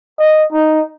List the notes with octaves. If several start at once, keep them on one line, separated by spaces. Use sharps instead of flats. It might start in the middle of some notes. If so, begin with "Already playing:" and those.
D#5
D#4